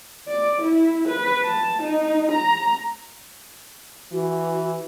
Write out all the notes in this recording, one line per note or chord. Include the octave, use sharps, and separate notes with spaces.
D5
E4
B4
A5
D#4
A#5
E3 F#4